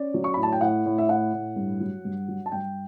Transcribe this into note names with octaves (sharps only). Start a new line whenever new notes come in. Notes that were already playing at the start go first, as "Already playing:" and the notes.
Already playing: C#4 D5
F#3
C#6
A2 B5
A5
G5
A2 F#5
A2
E5
A2 F#5
A2
G2
F#3
G2
F#3
A5
G2 G5